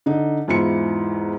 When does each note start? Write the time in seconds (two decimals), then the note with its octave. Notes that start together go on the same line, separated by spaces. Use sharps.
0.06 D3 D#4
0.48 E2 G#2 E4 F4 C#7